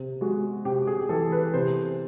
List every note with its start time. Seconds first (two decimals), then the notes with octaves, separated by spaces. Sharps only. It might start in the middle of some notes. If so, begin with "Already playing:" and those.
Already playing: C3
0.21 G#3 F#4
0.65 C3 G4
0.87 G#4
1.09 E3 A4
1.32 B4
1.54 C3 C5